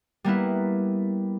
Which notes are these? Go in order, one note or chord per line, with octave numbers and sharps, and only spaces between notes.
G3 A#3 B3 E4